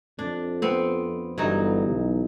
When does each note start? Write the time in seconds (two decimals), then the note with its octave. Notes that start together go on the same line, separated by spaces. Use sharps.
0.19 F2 D4
0.62 B3 C4
1.38 G1 E3 F#3 D#4
1.88 B1